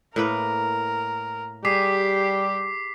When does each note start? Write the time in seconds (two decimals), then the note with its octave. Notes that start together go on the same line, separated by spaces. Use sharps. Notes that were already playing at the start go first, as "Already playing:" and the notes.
0.16 A2 A#3 A#4 B4
1.65 G3 G4 G#4 D6 B6 C7